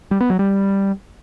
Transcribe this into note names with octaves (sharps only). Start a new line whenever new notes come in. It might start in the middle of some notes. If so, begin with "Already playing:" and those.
G3
B3
F#3
G3